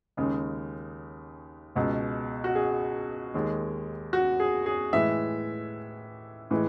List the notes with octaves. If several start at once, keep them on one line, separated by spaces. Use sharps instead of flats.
D#2 C#3 G#3
C#2 B2 G#3
F#4
G#4
D#2 D#3 G#3
F#4
G#4
G#4
A2 E3 G#3 E5
A2 E3 G#3